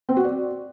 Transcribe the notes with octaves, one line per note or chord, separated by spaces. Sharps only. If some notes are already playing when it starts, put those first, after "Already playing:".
C4
F#4
D5